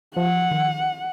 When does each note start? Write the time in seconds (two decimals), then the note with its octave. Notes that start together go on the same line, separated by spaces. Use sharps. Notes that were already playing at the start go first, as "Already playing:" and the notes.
0.16 F3 F#5
0.51 D#3